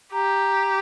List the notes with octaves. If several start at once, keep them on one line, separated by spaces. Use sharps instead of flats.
G4 A#5